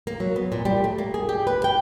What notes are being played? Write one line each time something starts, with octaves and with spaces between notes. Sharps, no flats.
A#3
F#3
B3
A#2
G3
A3
A#3
G#4
G4
B4
G5